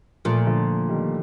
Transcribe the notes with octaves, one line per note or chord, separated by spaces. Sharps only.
A#2 F3 A3
D3 F3
D#3 G3